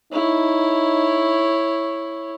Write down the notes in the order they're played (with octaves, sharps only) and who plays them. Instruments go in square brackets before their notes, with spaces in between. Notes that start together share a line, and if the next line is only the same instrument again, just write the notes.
[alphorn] D#4 [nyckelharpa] E4 C#5